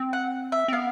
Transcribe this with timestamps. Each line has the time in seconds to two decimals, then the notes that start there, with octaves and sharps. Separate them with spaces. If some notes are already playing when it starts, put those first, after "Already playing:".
Already playing: C4
0.13 F#5
0.52 E5
0.68 C4
0.73 B3 F5